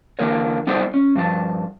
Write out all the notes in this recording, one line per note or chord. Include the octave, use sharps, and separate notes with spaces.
D3 E3 A#3 A#4 C#5
G3 B3 D#4 A4 C5 D5
C#4
G2 F3 F#4 A5